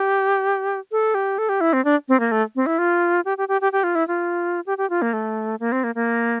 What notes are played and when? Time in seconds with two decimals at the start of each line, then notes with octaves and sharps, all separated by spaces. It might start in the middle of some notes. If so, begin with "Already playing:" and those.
Already playing: G4
0.92 A4
1.15 G4
1.38 A4
1.49 G4
1.61 E4
1.73 C4
1.85 D4
2.09 C4
2.20 A#3
2.32 A3
2.56 C4
2.66 E4
2.79 F4
3.25 G4
3.38 G4
3.48 G4
3.61 G4
3.72 G4
3.84 F4
3.95 E4
4.08 F4
4.67 G4
4.78 G4
4.90 F4
5.02 A#3
5.13 A3
5.60 A#3
5.72 C4
5.84 A#3
5.95 A#3